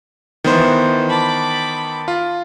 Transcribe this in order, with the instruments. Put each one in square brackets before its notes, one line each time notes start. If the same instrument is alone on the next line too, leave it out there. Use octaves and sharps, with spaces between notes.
[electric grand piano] D#3 B3 C5 [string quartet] E3
[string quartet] A5 B5 D6
[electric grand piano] F4